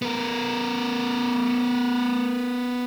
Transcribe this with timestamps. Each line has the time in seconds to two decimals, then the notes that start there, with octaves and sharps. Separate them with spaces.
0.02 B3 A#4